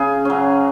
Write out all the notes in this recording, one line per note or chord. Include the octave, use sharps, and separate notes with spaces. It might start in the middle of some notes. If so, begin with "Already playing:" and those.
Already playing: C#3 G#4
F#3 C#4